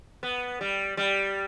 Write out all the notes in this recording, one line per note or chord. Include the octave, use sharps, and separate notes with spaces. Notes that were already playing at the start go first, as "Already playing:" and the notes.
B3
G3
G3